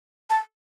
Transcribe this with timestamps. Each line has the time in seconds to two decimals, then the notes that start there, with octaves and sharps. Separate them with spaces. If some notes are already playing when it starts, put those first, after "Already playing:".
0.30 A5